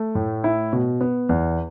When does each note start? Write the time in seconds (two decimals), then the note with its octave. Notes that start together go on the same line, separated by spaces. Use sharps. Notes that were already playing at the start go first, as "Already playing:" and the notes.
Already playing: A3
0.15 A2
0.44 E4
0.73 B2
1.01 B3
1.29 E2